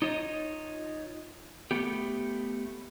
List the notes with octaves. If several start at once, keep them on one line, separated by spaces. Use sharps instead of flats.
D#4 F4 C#5 D#5
A3 B3 G4